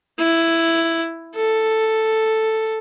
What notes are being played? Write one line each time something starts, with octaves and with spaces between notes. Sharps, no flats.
E4
A4